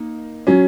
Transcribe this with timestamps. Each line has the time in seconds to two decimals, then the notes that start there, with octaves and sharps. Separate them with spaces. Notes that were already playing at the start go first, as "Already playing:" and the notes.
Already playing: A#3 D#4
0.47 F#3 C#4